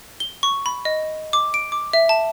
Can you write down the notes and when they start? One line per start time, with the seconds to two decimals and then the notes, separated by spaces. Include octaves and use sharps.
0.20 G7
0.43 C#6
0.66 B5
0.85 D#5
1.33 D6
1.54 D7
1.72 D6
1.93 E5
2.09 A5